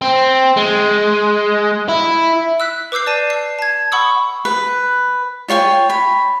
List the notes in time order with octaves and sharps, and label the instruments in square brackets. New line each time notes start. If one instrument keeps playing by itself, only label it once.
[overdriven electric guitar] C4
G#3
E4
[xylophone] E6 F#6 B6
B4 D6 E6 G6 C7
D5 A5 D#7
C7
A5 G#6
F#5 B5 C#6 D#6 E6
[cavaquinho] B4
F4 C#5 G5 G#5
B5